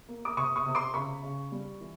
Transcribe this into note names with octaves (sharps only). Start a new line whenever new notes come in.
A#3
D6
C3 C#6 D#6
C#6 D#6
C3 D#6
C6 D6
C#3 B5 C#6
C#3
G3
E3